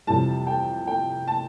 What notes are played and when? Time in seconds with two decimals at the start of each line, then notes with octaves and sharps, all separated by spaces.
0.07 F2 C3 E3 G3 A5
0.47 G5
0.87 G5
1.27 A5